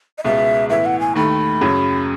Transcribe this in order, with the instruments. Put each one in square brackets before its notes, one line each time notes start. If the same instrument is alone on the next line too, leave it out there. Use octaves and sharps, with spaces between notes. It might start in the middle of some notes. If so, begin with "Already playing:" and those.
[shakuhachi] D#5
[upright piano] C#2 B2 G#3 [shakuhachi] E5
[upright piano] A2 E3 B3 E4 [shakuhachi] E5
[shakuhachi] F#5
G#5
[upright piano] D#2 D#3 A3 [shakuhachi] B5
[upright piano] F#2 C#3 F#3